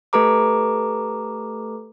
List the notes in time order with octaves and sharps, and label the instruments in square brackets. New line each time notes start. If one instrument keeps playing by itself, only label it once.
[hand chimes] A3 G4 A4 B4 A#5 D6